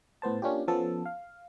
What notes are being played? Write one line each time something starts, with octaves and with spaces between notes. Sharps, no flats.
A2 B3 C5 A5
A#3 C#4 D4 F4 G4
F3 B3 C#4 A4
F5